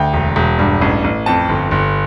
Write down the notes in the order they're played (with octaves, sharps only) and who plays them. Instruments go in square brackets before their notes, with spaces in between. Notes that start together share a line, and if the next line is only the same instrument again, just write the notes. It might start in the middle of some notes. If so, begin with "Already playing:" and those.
Already playing: [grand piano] D2 G5
E1
E1
G2
A1
A1
F2 A5
G1
G1